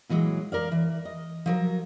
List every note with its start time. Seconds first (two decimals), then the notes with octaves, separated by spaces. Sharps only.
0.09 A#2 E3 F#3 G#3
0.52 A#4 D5 F5
0.72 E3
1.05 D#5
1.46 F3 F#3 A#4